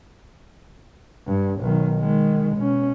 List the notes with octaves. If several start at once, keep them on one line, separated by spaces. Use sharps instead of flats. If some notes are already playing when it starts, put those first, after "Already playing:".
G2
B1 D#3
D#3 G#3
B2 C#4